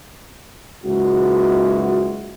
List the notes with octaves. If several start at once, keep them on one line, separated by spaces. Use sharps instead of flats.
F#1 C#2 G#2 G#3 E4 F#4